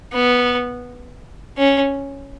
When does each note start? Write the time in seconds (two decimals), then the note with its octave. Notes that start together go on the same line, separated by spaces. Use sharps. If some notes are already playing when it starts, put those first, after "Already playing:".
0.13 B3
1.57 C#4